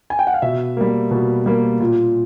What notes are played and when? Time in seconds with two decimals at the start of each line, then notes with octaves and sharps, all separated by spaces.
0.10 G#5
0.19 G5
0.27 F#5
0.34 F5
0.42 B2 E5
0.77 G3 A#3
1.11 B2
1.46 G3 A#3
1.80 A#2